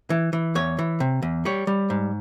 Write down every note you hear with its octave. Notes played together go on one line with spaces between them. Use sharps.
E3
E3
E2 C#5
E3
C3
E2
G3 C#5
G3
G#2